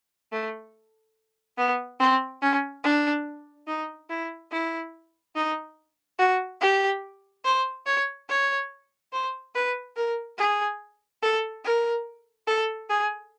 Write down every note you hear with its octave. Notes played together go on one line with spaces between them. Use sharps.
A3
B3
C4
C#4
D4
D#4
E4
E4
D#4
F#4
G4
C5
C#5
C#5
C5
B4
A#4
G#4
A4
A#4
A4
G#4